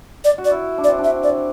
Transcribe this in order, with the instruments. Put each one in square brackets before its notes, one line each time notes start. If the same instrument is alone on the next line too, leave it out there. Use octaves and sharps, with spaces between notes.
[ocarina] D5
[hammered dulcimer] F#4
[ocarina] D5
[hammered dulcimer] E4
D4
[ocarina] D5
[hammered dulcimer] C4
D4
[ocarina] E5
D5